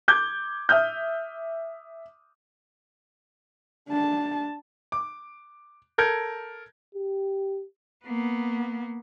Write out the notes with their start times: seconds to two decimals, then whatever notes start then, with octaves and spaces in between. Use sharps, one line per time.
0.08 D6 G6 G#6
0.69 E5 D#6 F6 G6
3.89 D4 A5
4.92 D6
5.98 A4 A#4 G6 G#6
6.95 G4
8.05 A#3 B3